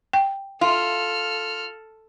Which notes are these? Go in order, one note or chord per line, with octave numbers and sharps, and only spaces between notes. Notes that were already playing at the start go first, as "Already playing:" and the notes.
G5
F4 A4 F6